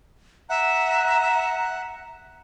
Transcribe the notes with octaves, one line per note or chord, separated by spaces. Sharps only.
E5 F#5 A#5